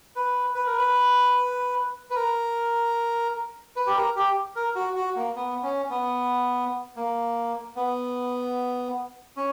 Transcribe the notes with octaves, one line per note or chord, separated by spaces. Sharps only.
B4
B4
A#4
B4
B4
A#4
B4
G4
A#4
G4
A#4
F#4
F#4
A#3
B3
C#4
B3
A#3
B3
C#4